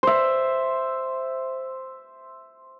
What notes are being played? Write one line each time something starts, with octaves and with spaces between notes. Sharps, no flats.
C5 E5